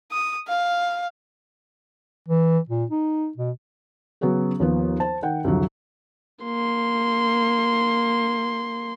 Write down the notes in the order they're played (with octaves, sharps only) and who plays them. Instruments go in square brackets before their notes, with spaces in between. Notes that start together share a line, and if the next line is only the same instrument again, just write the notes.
[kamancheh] D#6
F5
[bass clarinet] E3
A#2
D#4
B2
[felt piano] C#3 F#3 B3 C#4 F#4 G#4
D#2 F3 B3
C5 A5
D#3 F#5 G5
C2 F2 D3 F#3
[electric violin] A#3 C6